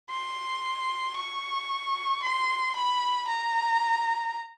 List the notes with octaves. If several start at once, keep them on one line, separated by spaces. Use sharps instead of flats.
C6
C#6
C6
B5
A#5